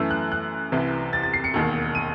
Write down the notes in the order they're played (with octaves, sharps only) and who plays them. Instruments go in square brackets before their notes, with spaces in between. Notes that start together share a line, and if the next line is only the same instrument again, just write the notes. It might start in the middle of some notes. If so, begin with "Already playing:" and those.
Already playing: [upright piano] F#2 E3 A3 E6
F#6
F#6
C2 C3 E3
A6
A6
C7
C#7
E1 D#2 D#3
D#7